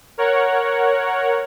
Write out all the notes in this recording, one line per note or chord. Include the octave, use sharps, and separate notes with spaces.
A#4 C#5 F#5